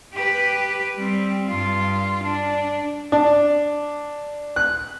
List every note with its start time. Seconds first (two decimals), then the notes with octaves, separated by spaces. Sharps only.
0.14 G4 B4
0.97 G3 C4
1.49 G2 F4
2.23 D4
3.12 D4
4.56 F#6